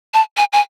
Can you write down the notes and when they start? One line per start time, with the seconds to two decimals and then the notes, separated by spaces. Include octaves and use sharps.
0.14 A5
0.37 G#5
0.53 G#5